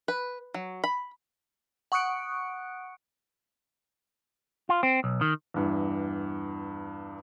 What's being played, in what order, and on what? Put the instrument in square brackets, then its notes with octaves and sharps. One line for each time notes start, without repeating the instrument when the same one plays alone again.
[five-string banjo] B4
F#3
B5
[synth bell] F#5 C#6 D#6 F#6 C#7 D7
[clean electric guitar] F4
C4
B1
D#3
[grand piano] E2 G2